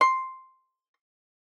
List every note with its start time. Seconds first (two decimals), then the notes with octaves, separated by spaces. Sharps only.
0.01 C6